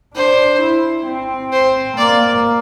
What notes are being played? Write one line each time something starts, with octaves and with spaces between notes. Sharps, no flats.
D4 C5
E4
C4
C5
A#3 D5